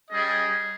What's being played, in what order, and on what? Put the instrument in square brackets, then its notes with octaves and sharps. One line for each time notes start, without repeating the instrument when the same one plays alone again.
[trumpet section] G3 C#4 G#4 D#5